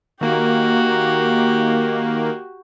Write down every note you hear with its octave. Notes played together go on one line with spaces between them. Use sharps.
D#3 A#3 F#4 G4